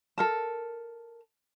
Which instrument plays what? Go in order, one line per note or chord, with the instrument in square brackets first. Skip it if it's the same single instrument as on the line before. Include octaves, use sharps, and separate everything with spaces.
[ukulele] A4 A#4 A5